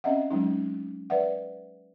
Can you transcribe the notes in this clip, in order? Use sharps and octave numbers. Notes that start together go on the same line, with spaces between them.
C4 C#4 D#5 E5 F#5
F#3 G#3 C#4 D#4
B4 D5 E5 F#5